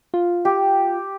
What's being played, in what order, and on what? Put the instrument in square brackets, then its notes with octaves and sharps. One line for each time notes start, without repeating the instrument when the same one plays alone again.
[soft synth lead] F4
[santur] G4